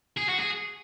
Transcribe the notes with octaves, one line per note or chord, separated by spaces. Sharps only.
G#4
F#4
G#4